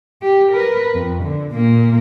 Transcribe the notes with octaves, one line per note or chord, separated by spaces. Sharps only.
G4
A#4 B4
F2
D3
A#2 A#3